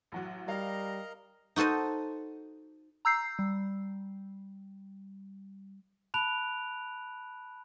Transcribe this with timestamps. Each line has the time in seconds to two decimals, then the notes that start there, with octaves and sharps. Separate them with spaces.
0.12 A1 F#3 F#4
0.48 G3 A#4 D#5 F5 A#5
1.56 D#4 F#4 A4 C5 D#5
3.05 A#5 E6 G6 C7
3.39 G3
6.14 A5 B5 F#6 D7 F7